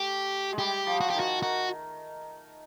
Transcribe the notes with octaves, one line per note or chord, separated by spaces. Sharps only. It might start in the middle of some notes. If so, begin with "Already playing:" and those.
Already playing: A3 G4
G#3
G3 G4
F3
F#4
G4
D#3
F#4
D#3 F#4